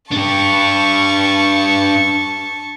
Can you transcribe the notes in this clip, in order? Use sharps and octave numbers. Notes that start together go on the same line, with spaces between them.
D4 G4 A5 C#6